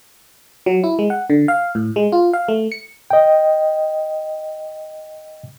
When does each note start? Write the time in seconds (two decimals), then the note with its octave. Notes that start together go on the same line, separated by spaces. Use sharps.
0.66 F#3
0.84 E4
0.99 G#3
1.10 F#5
1.30 D3
1.48 F5
1.75 A2
1.96 G#3
2.12 F4
2.33 F5
2.48 A3
2.72 C#7
3.10 D#5 G5